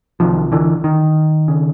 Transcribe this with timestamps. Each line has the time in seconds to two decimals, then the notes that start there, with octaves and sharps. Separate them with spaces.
0.20 C2 C3 D#3 F3
0.52 D3 E3
0.84 D#3
1.48 C#3